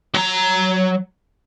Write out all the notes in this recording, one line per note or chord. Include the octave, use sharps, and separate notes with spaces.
F#3 A#5